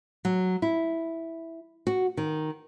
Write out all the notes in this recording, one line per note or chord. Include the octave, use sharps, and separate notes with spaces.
F#3
E4
F#4
D#3